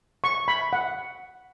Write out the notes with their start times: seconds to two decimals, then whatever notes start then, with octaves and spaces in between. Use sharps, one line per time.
0.24 C#6
0.48 B5
0.73 F#5